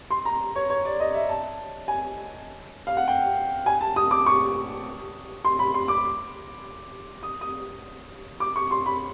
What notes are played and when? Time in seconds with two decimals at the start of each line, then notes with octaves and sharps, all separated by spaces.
0.11 C6
0.25 A#5
0.56 C#5
0.70 C#5
0.85 D5
1.00 D#5
1.15 E5
1.29 A5
1.88 G#5
2.87 F5
2.97 F#5
3.08 G5
3.66 G#5
3.81 A5
3.96 D#6
4.11 D6
4.26 C#6
5.45 C6
5.59 B5
5.74 C6
5.88 D6
7.23 D#6
7.41 D#6
8.40 D6
8.56 C#6
8.71 C6
8.86 B5